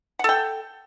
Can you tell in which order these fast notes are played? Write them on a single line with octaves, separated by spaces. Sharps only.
F#5 A4 G5